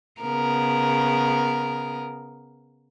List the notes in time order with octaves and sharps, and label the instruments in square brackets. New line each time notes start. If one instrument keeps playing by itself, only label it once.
[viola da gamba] C#3 B3 A#4